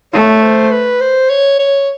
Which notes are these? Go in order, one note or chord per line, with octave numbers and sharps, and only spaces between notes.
A3 C#5
C5
B4
C5
C#5
C#5